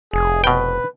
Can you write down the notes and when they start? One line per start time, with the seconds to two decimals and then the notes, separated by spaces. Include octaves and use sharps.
0.13 F1 G#4
0.44 B2 B4 G5